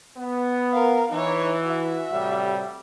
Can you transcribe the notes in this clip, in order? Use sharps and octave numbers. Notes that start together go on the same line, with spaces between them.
B3
A#4 F5
E3 D#4 C#5
F#4 E5
A2 C3 G3